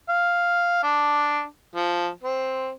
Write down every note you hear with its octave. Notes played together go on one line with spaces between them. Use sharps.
F5
D4
F3
C4